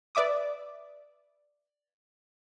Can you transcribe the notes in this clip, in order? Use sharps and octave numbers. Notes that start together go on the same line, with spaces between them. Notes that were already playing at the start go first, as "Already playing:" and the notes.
B4 D5 E5 D6 D#6